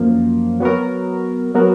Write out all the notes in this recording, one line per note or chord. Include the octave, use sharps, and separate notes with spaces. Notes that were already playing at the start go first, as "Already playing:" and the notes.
Already playing: F#2 F3 A#3
F#3 B3 F#4 A#4
F#3 B3 F#4 A#4